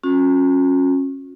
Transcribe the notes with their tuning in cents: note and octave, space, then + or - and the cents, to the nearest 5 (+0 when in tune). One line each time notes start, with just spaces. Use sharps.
C#4 -20 F#4 -45